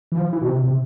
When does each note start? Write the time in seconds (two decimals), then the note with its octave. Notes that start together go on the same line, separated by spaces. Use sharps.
0.12 E3
0.17 F3
0.33 E3
0.42 B2
0.48 C3
0.64 C3